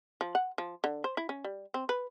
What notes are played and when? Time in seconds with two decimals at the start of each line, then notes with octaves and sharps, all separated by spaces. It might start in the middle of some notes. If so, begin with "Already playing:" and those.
0.21 F3
0.35 F#5
0.58 F3
0.84 D3
1.04 C5
1.17 E4
1.29 C#4
1.44 G3
1.74 C4
1.89 B4